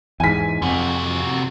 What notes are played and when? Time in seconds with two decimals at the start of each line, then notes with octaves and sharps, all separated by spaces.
0.20 E2 G#2 G#5 B6
0.62 F2 C3 F#4